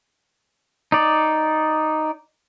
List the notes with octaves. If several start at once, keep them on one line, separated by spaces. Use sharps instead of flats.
D#4 D5